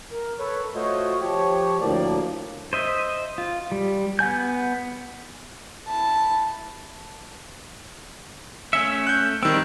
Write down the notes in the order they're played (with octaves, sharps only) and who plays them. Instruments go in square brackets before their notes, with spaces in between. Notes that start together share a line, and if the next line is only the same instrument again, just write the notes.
[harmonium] A#4
A4 B4 C#5
A3 F4 F#4 C5 C#5 D#5
F3 G4 C#5
D2 A2 F3 A#3 D5
[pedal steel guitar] C5 D#5 E5
F4
G3
B3 F#5 G#5 G6
[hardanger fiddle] E4 A5
[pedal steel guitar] A3 C#4 E5 [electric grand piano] C#7
[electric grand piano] F#6 G6
[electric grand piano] D#3 E6 [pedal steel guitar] G3 C4